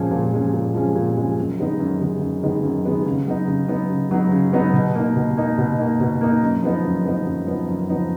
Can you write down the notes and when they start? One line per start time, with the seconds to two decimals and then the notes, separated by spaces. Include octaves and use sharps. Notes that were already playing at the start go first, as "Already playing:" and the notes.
Already playing: A#2 F3 G#3 C#4
0.11 A#2
0.33 F3 G#3 C#4
0.53 A#2
0.74 F3 G#3 C#4
0.95 A#2
1.17 F3 G#3 C#4
1.38 F#2
1.59 D#3 G#3 B3 D#4
1.80 F#2
2.01 D#3 G#3 B3 D#4
2.21 F#2
2.43 D#3 G#3 B3 D#4
2.63 F#2
2.85 D#3 G#3 B3 D#4
3.05 C#3
3.26 F#3 B3 D#4
3.47 C#3
3.68 F#3 B3 D#4
3.90 C#3
4.11 F#3 B3 D#4
4.31 C#3
4.53 F#3 B3 D#4
4.73 B2
4.95 A#3 D#4
5.16 B2
5.37 A#3 D#4
5.58 B2
5.79 A#3 D#4
6.00 B2
6.21 A#3 D#4
6.42 F#2
6.63 F3 B3 D#4
6.84 F#2
7.05 F3 B3 D#4
7.26 F#2
7.47 F3 B3 D#4
7.68 F#2
7.89 F3 B3 D#4